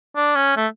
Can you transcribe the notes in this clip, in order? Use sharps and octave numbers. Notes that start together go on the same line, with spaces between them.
D4
C#4
A3